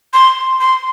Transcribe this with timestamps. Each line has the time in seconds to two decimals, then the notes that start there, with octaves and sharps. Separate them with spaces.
0.13 C6
0.61 C6